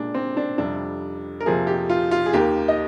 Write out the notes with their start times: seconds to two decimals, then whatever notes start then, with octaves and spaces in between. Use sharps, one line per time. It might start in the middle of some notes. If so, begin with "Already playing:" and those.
Already playing: A#2 G#3 D4
0.14 C4
0.37 D4
0.58 F2 C3 G3 D4
1.40 A#4
1.46 F2 C3 F3 A#3 G#4
1.67 G4
1.90 F4
2.11 F4
2.26 G#4
2.33 D#2 D#3 A#3 G4
2.68 D#5